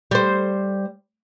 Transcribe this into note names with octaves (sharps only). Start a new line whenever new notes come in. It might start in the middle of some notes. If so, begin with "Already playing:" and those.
G3 C5